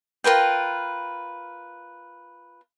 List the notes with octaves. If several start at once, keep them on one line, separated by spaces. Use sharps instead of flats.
F4 A#4 B4 G5